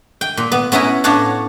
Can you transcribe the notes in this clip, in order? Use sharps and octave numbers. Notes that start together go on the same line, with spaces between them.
G5
A#2
B3
B3 C#4 E4 F#5 A#5
A2 D4 C#5 F5 F#5 A5